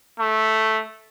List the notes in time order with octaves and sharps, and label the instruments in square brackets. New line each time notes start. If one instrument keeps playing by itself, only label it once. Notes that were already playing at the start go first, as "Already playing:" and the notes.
[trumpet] A3